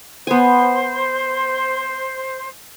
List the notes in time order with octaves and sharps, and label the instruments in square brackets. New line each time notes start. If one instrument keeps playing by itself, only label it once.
[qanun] B3 G#5 [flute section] C5